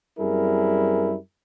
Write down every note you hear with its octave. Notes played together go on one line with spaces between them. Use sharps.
F#2 G3 C4 E4 G#4 A#4